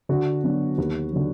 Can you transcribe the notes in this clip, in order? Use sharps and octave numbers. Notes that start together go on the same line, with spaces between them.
D3 F#4
F#3 B3 D4
D#2
D3 F#3